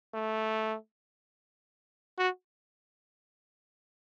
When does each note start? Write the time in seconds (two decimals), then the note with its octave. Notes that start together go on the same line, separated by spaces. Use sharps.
0.14 A3
2.18 F#4